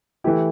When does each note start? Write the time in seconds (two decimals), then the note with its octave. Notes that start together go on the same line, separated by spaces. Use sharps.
0.24 E3 A3 E4 G4